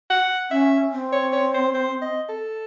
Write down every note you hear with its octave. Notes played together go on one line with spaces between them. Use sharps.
F#5
C#4 E5
C4
C#5
C#5
C5
C5
D#5
A4